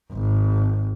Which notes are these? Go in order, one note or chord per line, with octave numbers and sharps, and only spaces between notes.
G#1